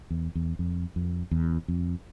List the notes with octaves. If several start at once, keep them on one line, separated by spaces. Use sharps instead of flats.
E2
E2
F2
F2
E2
F2